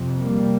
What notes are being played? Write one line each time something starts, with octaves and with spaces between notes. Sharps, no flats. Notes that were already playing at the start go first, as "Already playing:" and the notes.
Already playing: F2 C3
G3 A#3